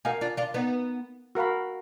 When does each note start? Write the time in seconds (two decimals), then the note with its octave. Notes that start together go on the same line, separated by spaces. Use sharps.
0.05 D#4 F#4 A#4 F5 G#5
0.21 D4 F4
0.37 D4 F4
0.54 B3 D#4
1.35 F#4 A#4 F5 B5